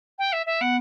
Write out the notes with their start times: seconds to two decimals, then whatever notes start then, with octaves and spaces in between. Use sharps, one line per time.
0.18 G5
0.32 E5
0.46 E5
0.61 B3 F#5